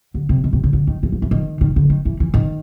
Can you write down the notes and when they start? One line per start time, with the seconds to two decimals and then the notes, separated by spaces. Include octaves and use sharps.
0.14 D3
0.29 C3
0.44 B2
0.53 C3
0.64 C#3
0.73 D3
0.87 D#3
1.03 E3
1.12 F3
1.22 E3
1.31 D#3
1.61 D#3
1.76 D3
1.90 D#3
2.05 E3
2.20 E3
2.34 D#3